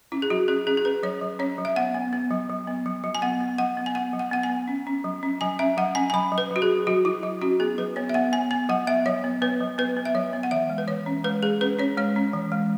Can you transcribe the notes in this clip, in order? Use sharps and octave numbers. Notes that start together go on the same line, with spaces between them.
C#4 E4
G#4
F#3 F#4
C#4 G#4
C#4 G#4
G#4
C#4 B4
F#3 C#5
F#3
C#4 C#5
F#3
E5
B3 F#5
B3
B3
F#3
F#3
B3
F#3
F#3
G#5
B3 F#5
B3
F#3 F#5
B3
G#5
B3 F#5
F#3
F#5
B3 F#5
G#5
B3
C#4
C#4
F#3
C#4
F#3 G#5
C#4 E5
F#3 F#5
C#4 G#5
G#5
F#3 B5
F#3
B4
F#3
F#4
G#4
F#3
F#3 F#4
F#3 E4
F#3 E4
C#4 F#4
B3 G#4
F#3 B4
B3 C#5
E5
B3 F#5
B3 G#5
B3 G#5
F#3 F#5
B3 E5
F#3 C#5
B3
B3 B4
F#3
B3 B4
B3
E5
F#3 C#5
B3
F#5
E3 E5
G#3
B4
E3 C#5
C#4
G#3 B4
G#3 G#4
C#4 B4
C#4 C#5
G#3 C#5
C#4
E3
G#3